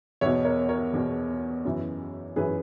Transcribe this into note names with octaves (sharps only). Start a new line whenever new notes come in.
E2 B2 C#5 E5
A#4 C#5
A#4 C#5
E2 B2
F#2 E3
F#2 E3 G#4 B4